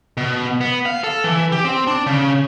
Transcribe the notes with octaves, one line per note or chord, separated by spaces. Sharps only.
B2
B3
F5
A4
E3
G4
C4
D4
C#3